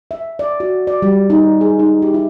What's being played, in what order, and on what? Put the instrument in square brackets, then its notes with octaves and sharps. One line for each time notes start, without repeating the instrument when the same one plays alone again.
[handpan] E5
D5
F#4
D5
G3
D#4
G#4
D#4
G4
E4